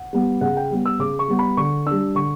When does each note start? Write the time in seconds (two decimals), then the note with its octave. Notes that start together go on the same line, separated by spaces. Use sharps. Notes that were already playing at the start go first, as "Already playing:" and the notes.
Already playing: F#5
0.13 G3 B3
0.41 C#3 F#5
0.57 G5
0.71 G3 B3
0.86 E6
1.00 C#3 D6
1.19 C#6
1.28 G3 B3
1.39 B5
1.57 D3 C#6
1.86 G3 D4 E6
2.15 D3 C#6